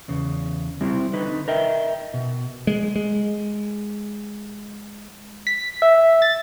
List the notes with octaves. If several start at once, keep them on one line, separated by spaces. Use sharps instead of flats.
E2 C#3
G3 C4 E4
D3 D#4 B4
A#4 D#5 E5 G5
B2
G#3
G#3
B6
E5
A6